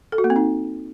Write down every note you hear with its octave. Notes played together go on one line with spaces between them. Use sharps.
A4
F#4
A#3
C4
D#4